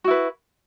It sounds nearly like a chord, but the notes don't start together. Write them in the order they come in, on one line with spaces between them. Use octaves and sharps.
F#4 E4 B4